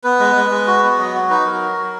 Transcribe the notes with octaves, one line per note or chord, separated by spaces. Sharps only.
B3 B4
G#3
G#3
G#3
F#4
B3
F#3 D#5
F#4
D#4 B4
F#3 A#4
F#4
F#3